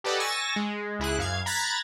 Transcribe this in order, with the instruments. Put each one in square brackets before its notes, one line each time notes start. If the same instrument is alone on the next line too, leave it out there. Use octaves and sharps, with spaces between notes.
[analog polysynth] G4 A4 B4 D5 D#5 F#5
G#5 C#6 E6 A6 A#6
G#3
C#2 E4 G#4 F#6
F#2 F5 G#6
A#5 B5 F#6 G#6 A6 B6